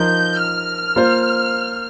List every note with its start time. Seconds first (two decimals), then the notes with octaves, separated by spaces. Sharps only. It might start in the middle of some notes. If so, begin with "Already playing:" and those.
Already playing: F3 D#4 A#4 G6
0.42 F6
0.96 A#3 F4 C5